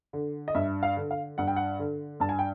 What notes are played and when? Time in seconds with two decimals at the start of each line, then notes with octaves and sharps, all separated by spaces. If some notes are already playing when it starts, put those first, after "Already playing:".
0.13 D3
0.48 D#5
0.55 G2 E5
0.83 F5
0.97 D3
1.11 F5
1.38 G2 F#5
1.47 G5
1.56 F#5
1.79 D3
2.20 G2 A5
2.29 G#5
2.39 G5